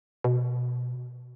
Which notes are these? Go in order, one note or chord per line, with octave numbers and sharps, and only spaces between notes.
B2